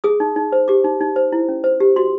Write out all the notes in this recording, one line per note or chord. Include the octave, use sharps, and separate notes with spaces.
G#4 D#6
D#4
D#4
C5
G4 D6
D#4
D#4
C5
E4
C#4
C5
G4
F#4 C6